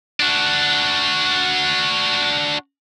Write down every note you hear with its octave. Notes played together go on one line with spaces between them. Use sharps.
D4 F#4